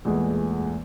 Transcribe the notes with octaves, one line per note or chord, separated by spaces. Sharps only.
E2 A#2 G#3 A3 B3